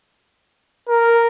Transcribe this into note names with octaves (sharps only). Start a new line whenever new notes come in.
A#4